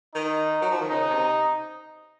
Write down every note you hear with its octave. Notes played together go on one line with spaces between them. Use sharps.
D#3 D#4
F#3
F3
D#3
C#3 D#4
C3